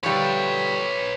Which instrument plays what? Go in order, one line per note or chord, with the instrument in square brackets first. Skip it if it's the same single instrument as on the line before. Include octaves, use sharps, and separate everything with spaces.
[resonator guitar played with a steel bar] D3 F3 G3 [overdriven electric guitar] B4 C#5